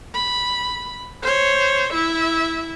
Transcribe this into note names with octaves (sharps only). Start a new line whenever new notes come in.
B5
C5 C#5
E4 E5